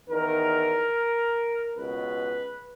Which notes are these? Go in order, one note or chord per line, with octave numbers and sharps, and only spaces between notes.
E2 D#3 A#4
C#2 B2 B4